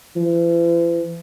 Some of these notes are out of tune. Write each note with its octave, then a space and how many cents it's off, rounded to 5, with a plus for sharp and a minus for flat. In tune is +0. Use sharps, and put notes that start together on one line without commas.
E3 +45